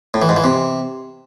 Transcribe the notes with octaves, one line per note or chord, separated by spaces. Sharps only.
A2
E3
G#2
E3
C3